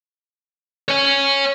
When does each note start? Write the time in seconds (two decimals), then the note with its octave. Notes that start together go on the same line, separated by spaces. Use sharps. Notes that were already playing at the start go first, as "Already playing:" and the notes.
0.89 C#5 G#5